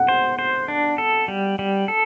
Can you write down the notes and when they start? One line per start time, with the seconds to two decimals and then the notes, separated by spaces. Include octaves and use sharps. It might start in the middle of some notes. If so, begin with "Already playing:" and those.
Already playing: F#5
0.08 C5
0.39 C5
0.68 D4
0.98 A4
1.28 G3
1.59 G3
1.88 A4